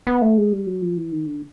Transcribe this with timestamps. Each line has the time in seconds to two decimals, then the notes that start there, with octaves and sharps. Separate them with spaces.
0.07 B3
0.22 A3
0.37 G#3
0.53 G3
0.67 F#3
0.82 F3
0.97 E3
1.12 D#3
1.26 D3